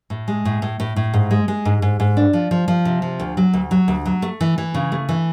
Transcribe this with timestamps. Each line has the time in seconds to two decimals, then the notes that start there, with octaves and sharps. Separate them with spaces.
0.10 A2
0.28 G#3
0.45 A2
0.62 A2
0.80 A2
0.96 A2
1.13 G#2
1.31 G#3
1.48 G#3
1.65 G#2
1.82 G#2
2.00 G#2
2.17 D4
2.33 F3
2.51 F3
2.68 F3
2.85 C3
3.02 F3
3.20 D2
3.37 F#3
3.53 D2
3.71 F#3
3.88 D2
4.06 F#3
4.22 A3
4.41 E3
4.58 E3
4.74 C#3
4.92 A3
5.09 E3